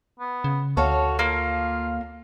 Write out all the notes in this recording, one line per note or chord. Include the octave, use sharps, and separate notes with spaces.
B3
C#3
D2 F#4 A4 C#5 F5
A#3 F4